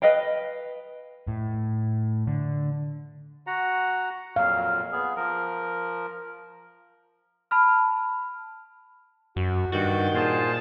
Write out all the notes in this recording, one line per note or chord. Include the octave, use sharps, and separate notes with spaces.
B4 D#5 F5 G5
A2
D3
F#4 F#5 A#5
F2 A#2 F#3 F5
B3 G#4
F3 A#4
A5 B5 F6
F#2 F#4
G2 D#3 F#4 G6 A6
A#2 F4 G#4 C5 A5